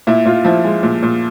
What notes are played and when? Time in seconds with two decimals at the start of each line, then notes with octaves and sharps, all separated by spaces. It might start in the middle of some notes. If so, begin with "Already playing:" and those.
0.07 A#2 E4
0.26 A#2 F4
0.45 F3 E4
0.64 G#3
0.83 A#2
1.03 A#2